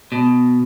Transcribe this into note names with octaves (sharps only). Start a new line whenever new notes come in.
B2